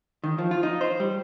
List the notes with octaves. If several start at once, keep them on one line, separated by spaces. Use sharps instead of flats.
D#3
F3
F4
D#4
C5
G3